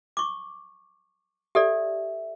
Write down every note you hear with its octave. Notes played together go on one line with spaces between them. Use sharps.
C#6 D6
G4 A4 D5 E5